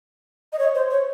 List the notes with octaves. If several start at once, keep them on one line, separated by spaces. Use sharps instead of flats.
D#5
C#5
C5
C#5